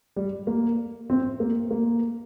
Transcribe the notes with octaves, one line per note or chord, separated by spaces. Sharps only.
G3
A#3
C4
A#3
A#3